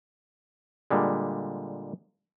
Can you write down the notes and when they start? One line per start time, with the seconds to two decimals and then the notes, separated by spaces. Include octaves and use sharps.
0.91 A#2 D3 G3 G#3